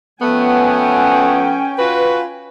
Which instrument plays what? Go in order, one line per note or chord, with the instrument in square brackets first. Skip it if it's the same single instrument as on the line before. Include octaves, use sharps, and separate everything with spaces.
[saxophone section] F3 A3 B3 [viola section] C#4 G5 G#5
[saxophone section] F4 F#4 B4